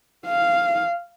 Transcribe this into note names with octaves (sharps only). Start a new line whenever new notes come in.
F5